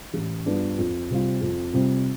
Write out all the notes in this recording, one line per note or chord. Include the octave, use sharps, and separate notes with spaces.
A1
G2 F3 B3 D4
F2
C3 G3 C4 F4
F2
C3 G3 C4 F4